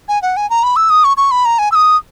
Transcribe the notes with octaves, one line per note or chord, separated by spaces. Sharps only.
G#5
F#5
G#5
A#5
B5
E6
D#6
C#6
C#6
B5
A#5
G#5
E6
D#6